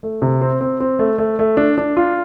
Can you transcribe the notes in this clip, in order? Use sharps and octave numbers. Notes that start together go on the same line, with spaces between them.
A3
C3
C4
C4
C4
A3
A3
A3
D4
D4
F4